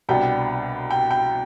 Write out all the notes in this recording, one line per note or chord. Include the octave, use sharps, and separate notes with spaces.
C2 B2 B3 D4 G5
G5
G5